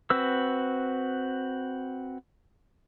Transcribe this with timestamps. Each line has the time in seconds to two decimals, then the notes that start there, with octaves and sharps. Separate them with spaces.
0.10 C4 F#4 B4 E6